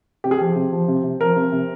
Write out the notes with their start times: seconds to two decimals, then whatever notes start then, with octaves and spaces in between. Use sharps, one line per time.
0.24 C3 G4
0.31 G#4
0.39 F3 G4
0.56 C3
0.72 F3
0.88 C3
1.04 C3
1.20 F3 A#4
1.36 C3
1.52 C3